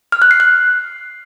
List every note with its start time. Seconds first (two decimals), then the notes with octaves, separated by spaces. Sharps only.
0.12 F6
0.22 F#6
0.31 C7
0.40 F#6